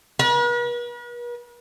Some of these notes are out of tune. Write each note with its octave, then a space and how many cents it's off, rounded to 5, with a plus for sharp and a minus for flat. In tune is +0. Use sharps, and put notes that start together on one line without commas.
B4 -45